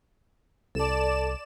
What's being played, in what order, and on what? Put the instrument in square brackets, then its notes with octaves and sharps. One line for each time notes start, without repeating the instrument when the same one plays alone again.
[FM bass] C2 [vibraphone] A4 A5 [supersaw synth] D5 E7